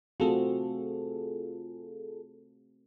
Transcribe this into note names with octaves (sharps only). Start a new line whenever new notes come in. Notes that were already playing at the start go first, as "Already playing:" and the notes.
A3 C4 F4 F#4 G#4 A4